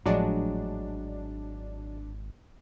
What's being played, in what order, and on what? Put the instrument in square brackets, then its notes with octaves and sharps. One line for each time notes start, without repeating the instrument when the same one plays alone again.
[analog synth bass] G#1 [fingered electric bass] A2 F3 [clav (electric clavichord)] F#3 G#3 [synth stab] D4